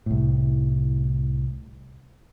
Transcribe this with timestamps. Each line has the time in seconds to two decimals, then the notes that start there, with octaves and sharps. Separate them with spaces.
0.06 C2 A2